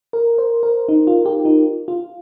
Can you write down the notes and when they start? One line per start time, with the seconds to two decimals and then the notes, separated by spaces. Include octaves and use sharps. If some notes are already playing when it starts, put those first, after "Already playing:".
0.13 A#4
0.38 C5
0.63 A#4
0.88 D#4
1.07 F4
1.25 G4
1.45 D#4
1.88 F4